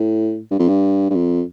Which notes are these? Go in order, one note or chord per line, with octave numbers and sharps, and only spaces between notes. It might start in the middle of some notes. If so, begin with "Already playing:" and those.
Already playing: A2
G2
F2
G2
G2
F2